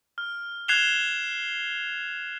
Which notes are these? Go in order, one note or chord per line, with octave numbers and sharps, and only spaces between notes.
F6
F#6 G#6 C7 E7 F7 G7